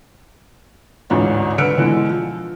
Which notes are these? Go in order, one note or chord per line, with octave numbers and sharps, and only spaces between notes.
A1 D2 G#2 D4 F4
D3 B4 E6 F6 C#7 D7
B2 D3 E3 G#3
F3